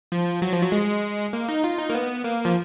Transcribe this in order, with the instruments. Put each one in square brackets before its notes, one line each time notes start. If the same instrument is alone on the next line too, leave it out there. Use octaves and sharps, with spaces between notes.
[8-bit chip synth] F3
F#3
F3
F#3
G#3
A#3
D#4
F4
D#4
A#3
B3
A#3
F3